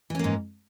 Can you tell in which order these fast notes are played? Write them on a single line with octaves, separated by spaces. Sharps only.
E3 C#4 A#3 G#2